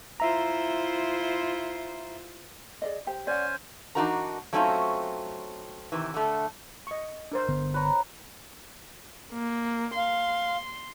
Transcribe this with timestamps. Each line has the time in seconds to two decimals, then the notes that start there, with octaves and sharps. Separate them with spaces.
0.20 E4 F4 C5 E5 A#5
2.82 G#4 D5 D#5
3.07 G4 C5 G5
3.27 C#4 C5 D5 F#5 G#5
3.95 E3 D4 D#4 F#4 A#4 A#5
4.53 F#3 A3 C4 C#4 D#4 F4
5.92 C3 D#3 E3
6.14 D3 A3
6.87 D#5 C#6
7.32 D4 A#4 C5
7.48 G1 D3 B3
7.74 B4 C#5 A#5
9.33 A#3
9.96 F5 C6